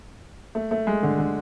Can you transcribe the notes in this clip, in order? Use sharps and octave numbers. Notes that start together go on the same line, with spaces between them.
A3
A3
G#3
D3
D3